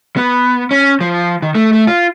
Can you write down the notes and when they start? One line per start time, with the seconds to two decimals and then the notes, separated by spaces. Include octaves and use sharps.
0.17 B3
0.71 C#4
1.01 F3
1.42 D#3
1.55 A3
1.73 A3
1.87 F4